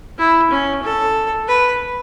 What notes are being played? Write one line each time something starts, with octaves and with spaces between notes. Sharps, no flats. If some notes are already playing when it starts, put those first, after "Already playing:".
E4
C#4
A4
B4